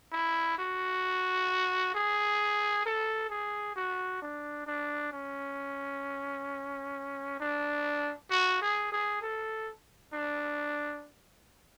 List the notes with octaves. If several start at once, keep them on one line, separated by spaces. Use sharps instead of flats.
E4
F#4
G#4
A4
G#4
F#4
D4
D4
C#4
D4
F#4
G#4
G#4
A4
D4